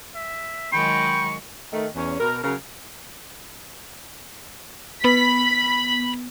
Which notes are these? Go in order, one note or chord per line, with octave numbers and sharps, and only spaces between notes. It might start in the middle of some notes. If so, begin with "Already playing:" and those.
E5
D#3 F#3 G#3 G5 B5 C#6
D#3 A3
E2 C#4
B2 A#4
C#3 F#3 A#4
B3 B5 B6